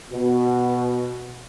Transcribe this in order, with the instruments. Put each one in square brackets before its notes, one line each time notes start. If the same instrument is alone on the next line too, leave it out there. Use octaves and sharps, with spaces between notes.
[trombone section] B2